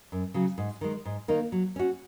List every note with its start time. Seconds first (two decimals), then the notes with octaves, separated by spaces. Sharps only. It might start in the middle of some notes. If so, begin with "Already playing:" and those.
0.12 F#2
0.34 C#3 F#3
0.58 G#2
0.81 D#3 G#3
1.05 G#2
1.28 D#3 A#3 D#4
1.52 F#3
1.76 C#4 F#4